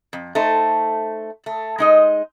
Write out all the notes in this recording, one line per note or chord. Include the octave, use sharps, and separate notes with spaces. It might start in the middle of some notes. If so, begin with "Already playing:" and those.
F2
A3 D#4 C5
A3
G#3 D#4 D#5